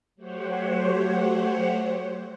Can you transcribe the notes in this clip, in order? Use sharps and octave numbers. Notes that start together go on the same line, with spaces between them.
F#3 A3 G4 C5 C#5 F#5